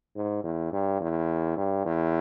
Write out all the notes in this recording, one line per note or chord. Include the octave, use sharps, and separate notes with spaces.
G#2
E2
G2
E2
G2
E2